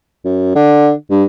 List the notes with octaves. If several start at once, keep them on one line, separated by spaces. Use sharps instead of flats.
F#2
D3
G2